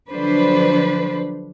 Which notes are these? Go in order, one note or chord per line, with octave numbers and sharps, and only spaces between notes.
D3 F3 F#3 D4 B4 C5